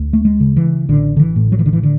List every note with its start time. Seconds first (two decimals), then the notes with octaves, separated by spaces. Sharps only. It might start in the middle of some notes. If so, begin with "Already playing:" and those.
Already playing: D2
0.13 A3
0.25 G#3
0.40 C#3
0.56 E3
0.89 A1 D3
1.16 D3
1.19 E3
1.36 A2
1.52 F#3
1.59 E3
1.66 D3
1.73 E3
1.83 D3